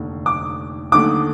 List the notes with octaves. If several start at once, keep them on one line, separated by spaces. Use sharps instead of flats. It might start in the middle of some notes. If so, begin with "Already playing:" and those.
Already playing: F1 D#2 D3
D6
D#2 D3 A3 D6